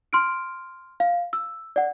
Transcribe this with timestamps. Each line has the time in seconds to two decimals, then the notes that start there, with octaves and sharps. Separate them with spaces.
0.13 C6 F6 D7
1.00 F5
1.33 E6
1.76 D5 F#5